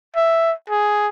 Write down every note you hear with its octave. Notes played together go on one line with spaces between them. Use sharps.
E5
G#4